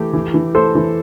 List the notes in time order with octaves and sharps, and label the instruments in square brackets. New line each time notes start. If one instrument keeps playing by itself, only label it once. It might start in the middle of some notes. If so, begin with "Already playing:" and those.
Already playing: [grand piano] E3 A3 [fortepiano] G4
[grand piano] E3
E3
[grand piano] A3 [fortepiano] A4 C5
[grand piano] E3